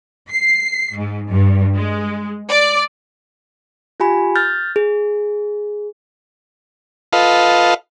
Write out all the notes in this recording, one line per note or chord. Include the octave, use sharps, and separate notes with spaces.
C7
G#2
G2
G#3
D5
F4 G4 G#5 B5
F6 G6 A6
G#4
F4 A4 B4 D#5 F5